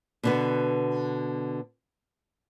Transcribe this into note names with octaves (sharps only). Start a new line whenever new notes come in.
B2 D3 B3